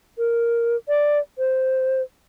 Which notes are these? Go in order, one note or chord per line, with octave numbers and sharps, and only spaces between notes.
A#4
D5
C5